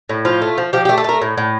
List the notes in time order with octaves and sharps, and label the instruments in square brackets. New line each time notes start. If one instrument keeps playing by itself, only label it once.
[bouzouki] A2
F3 F4
A3
F3
F3 G4
G4
A3
A4
A3 A#4
A2
A2